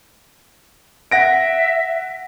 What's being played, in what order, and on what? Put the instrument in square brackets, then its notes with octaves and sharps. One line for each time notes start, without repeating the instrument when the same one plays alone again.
[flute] E5 [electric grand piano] F#5 A#6 D7